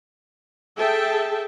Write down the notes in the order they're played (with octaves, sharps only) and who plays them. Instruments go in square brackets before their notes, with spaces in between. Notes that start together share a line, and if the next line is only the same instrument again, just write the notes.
[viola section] G#4 A4 E5 G5 A5